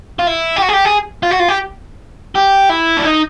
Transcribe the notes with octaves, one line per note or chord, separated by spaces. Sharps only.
F4
E4
G4
F#4
G#4
G4
G#4
F4
F#4
F4
G4
G4
E4
D4
D#4